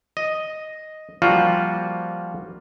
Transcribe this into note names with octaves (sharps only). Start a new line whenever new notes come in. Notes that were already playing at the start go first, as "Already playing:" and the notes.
D#5
F3 G3 A#3 F4 F#4